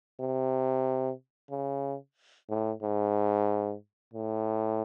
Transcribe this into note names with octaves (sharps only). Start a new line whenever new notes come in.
C3
C#3
A2
G#2
A2